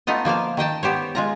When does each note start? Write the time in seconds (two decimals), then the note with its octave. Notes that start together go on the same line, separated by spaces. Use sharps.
0.07 A3 B3 D#4 F4 D#5
0.25 F3 A#3 C5 F5
0.57 D#3 D#5 G5 A5
0.83 B3 G4 C5 C#5
1.15 G#3 F4 A#5